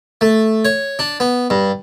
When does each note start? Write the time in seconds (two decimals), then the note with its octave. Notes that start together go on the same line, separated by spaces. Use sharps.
0.21 A3
0.65 C#5
0.99 D4
1.20 B3
1.50 G2